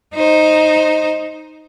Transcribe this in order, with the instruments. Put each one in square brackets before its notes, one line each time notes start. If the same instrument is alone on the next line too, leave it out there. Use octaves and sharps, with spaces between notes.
[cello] D#4 C5